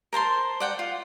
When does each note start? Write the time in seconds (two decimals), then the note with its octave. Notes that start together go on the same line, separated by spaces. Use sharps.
0.13 A#4 C5 A5 C6
0.60 D5 F#5 G5
0.79 F4